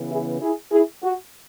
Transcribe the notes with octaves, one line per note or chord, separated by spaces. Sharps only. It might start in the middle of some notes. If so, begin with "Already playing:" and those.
Already playing: C#3 E3 B3
E4 G#4
E4 G#4
E4 G#4
F#4